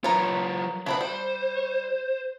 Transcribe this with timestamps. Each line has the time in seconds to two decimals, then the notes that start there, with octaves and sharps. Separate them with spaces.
0.04 F#3 F4 A#4 B4 C#5
0.86 C#3 B3 C4 D4 B5
1.01 G3 C5